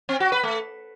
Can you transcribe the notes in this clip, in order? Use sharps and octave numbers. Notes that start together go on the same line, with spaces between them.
C4
F#4
B4
A3